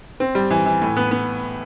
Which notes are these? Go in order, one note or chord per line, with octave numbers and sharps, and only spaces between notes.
C4
G3
E3
E3
A2
B3
B3